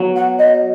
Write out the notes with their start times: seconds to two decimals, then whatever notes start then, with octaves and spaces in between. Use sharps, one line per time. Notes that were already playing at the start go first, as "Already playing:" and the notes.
Already playing: F#3 B3
0.16 F#5
0.39 D#5